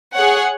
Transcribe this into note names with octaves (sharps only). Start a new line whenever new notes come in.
G#4 C#5 F#5